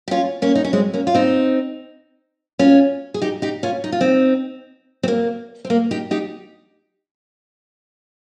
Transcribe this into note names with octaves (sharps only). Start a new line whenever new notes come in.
G4
C#4 F4
A#3 C#4
D#4
C#4
G#3 C4
A#3 C#4
F4
C4 D#4
C#4 F4
G#4
D#4 G4
D#4 G4
C#4 F4
D#4
F4
C4 D#4
C4
A#3
C4
A#3
D#4 G4
D#4 G4